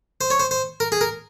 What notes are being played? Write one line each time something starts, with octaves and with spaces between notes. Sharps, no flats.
C5
C#5
C5
C5
A#4
G#4
A#4